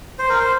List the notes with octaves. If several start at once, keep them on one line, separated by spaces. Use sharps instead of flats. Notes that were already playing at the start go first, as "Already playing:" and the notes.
C5
A#4
C5